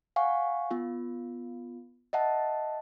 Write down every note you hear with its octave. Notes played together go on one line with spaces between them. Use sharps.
F5 F#5 G#5 C#6
B3 F4
D#5 E5 F#5 A5